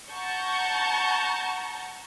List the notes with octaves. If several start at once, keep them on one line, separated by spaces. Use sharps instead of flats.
F#5 A5 A#5 C#6 G6